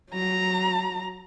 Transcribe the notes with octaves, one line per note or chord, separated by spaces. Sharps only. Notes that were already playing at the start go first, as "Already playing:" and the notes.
F#3 A#5